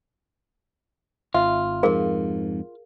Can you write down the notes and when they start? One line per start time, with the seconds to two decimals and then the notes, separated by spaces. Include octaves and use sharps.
1.34 G#1 F4 E5
1.83 F2 G#2 G#4 A#4 F5